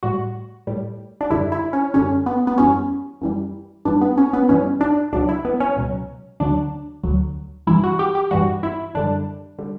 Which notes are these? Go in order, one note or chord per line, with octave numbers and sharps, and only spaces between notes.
A2 G3 F#4
A2 G3
D4
F#2 D3 G3 E4
E4
C#4
F#2 D3 G3 C#4
B3
B3
F#2 E3 G3 C#4
F#2 E3 G3
G2 E3 G3 D4
B3
C#4
B3
G2 E3 G3 C#4
D4
C#2 B2 F#3 D4
E4
B3
C#4
C#2 B2 F#3
D2 D3 F#3 D4
D2 D3 F#3
G2 E3 G3 E4
F#4
G4
G4
G2 E3 G3 F#4
E4
F#2 D3 G3 D4
D3 G3